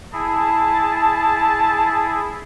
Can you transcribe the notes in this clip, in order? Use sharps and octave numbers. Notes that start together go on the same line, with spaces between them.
E4 G#4 A5